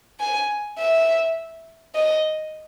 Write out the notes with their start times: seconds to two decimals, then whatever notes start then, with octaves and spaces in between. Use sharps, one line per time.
0.20 G#5
0.79 E5
1.95 D#5